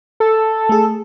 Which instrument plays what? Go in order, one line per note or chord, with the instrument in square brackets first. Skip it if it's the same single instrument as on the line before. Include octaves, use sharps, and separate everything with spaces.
[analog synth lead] A4
[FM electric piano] A3 G#4